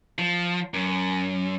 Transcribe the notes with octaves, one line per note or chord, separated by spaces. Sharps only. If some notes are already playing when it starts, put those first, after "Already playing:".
F3
F#2